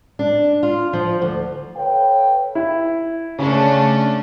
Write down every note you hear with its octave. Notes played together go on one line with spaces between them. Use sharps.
D4
F4
F3
D2
A4 B4 C#5 F5 G5
E4
C#3 A3 C#4 D4